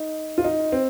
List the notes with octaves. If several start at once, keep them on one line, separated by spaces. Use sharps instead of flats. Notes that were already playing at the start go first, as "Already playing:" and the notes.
Already playing: D#4
F4
D#4
C4